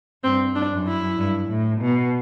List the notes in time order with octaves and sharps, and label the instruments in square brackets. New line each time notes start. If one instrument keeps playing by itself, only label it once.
[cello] G2 [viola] C4
[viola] D4
[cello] F#2
[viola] E4
[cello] G2
A2
B2